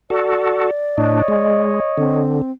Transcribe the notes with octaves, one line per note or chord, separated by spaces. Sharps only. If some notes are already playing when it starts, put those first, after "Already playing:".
F#4 A4 D5
A2 D4 C#5 D#5
G#3
D3 C4